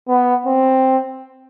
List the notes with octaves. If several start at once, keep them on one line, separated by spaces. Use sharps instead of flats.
B3
C4